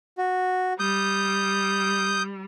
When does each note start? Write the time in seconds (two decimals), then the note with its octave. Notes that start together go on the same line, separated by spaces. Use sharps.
0.18 F#4
0.80 G3 D#6 G6